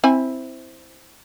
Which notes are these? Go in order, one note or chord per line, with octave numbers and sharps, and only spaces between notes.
C4 E4 G#5